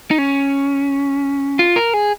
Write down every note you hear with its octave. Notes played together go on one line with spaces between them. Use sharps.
D#4
C#4
F4
A#4
G#4